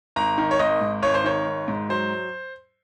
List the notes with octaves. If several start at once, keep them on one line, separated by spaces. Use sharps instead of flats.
G#1 A#5
D#3
C#5
G#1 D#5
G#2
G#1 C#5
C5
D#3 C#5
G#1
G#2
F#3 C5